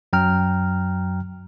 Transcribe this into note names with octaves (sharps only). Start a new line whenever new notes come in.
F#2 F#3 G5 A#5 F6